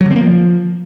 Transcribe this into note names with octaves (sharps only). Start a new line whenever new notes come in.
F#3
D3
C4
A#3
F3